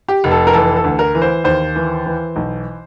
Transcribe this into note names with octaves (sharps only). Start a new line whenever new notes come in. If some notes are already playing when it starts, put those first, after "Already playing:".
G4
F1
A4
A#4
E3 A4
A4
D2
A#4
E3
C5
D#2 C5
E3
E3
B1